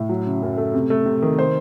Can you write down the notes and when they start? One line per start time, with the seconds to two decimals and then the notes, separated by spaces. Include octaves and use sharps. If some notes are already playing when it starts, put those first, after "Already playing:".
Already playing: A2
0.09 F#3
0.26 C#3
0.42 F#2
0.57 A3
0.74 C3
0.90 A3
1.06 C3
1.22 D#3
1.39 C5